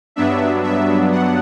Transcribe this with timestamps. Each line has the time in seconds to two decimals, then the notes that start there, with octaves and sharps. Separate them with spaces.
0.16 G2 F#3 B3 D4 E5
0.64 E5
1.12 F#5